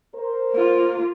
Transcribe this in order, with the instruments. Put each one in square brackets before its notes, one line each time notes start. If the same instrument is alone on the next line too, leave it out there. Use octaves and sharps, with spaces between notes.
[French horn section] A#4 C5
[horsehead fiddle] A#3 F4